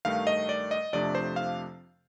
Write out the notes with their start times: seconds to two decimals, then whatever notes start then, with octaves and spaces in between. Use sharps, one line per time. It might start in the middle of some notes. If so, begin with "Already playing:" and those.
0.05 G2 D#3 A3 F5
0.27 D#5
0.49 D5
0.71 D#5
0.93 F2 C3 F3 A3 D4 D5
1.15 C5
1.36 F5